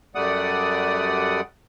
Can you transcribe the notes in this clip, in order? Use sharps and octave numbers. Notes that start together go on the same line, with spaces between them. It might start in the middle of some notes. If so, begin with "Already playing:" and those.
F#2 G3 A3 D5 F#5 D#6